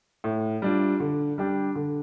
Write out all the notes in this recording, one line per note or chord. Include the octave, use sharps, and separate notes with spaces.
A2
G3 D4 F4
D3
G3 D4 G4
D3